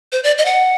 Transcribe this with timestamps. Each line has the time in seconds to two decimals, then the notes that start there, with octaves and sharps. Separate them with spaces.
0.12 C5
0.24 D5
0.38 D#5
0.45 F#5